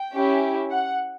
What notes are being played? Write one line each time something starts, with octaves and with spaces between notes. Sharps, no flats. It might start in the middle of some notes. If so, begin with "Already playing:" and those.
Already playing: G5
C#4 E4 G4
F#5